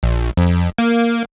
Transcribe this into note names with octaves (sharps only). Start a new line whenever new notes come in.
A#1
F2
A#3